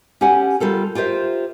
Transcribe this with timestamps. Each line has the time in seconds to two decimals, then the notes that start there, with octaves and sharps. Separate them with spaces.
0.21 C#4 G4 A4 F#5 G#5
0.60 G3 F4 A4 A#4
0.95 F4 G4 A#4 C5 E5